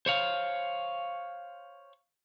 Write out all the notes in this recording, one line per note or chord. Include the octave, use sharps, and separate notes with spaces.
C5 C#5 F5